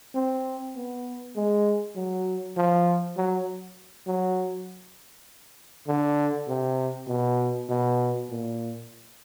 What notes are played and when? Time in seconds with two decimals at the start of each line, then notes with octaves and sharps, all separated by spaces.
0.15 C4
0.76 B3
1.36 G#3
1.95 F#3
2.57 F3
3.17 F#3
4.07 F#3
5.87 D3
6.48 C3
7.08 B2
7.69 B2
8.29 A#2